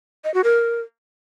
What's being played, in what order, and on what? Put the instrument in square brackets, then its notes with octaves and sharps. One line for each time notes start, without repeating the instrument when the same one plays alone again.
[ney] D#5
F#4
A#4